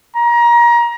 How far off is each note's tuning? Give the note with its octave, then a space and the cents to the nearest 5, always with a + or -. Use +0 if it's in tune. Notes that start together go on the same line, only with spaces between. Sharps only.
A#5 +25